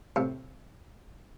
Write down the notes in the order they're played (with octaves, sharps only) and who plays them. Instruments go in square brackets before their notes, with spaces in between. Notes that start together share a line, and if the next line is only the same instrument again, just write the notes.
[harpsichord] A2 C3